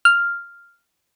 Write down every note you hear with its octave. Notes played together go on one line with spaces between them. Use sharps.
F6